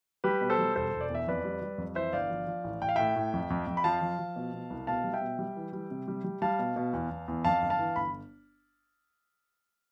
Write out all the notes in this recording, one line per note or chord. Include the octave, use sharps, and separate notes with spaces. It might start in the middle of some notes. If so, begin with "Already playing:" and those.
G3 G4 B4
B2
A4 C5
G3
E1 A4 C5
E1
D5
E2
E5
F2 B4 D5
G3
G3
F2
E3 C5 E5
G1 D5 F5
F3
F3
A1
A1 G5
F5
A2 E5 G5
A2
F2
F2
F2
B5
F3 F5 A5
F3
F3
B2
B2
C2
B2 F5 A5
G3
E5 G5
B2
G3
E3
G3
C3
G3
G3
G3 F5 A5
B2
B2
E2
E2
E2
F2 F5 A5
G1
F5 A5
E3
G1 B5